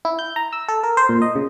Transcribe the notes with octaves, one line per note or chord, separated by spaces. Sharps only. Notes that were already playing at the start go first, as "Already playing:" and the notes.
E4
G6
A#5
E6
A4
A#4
C5
A#2
D#5
C#3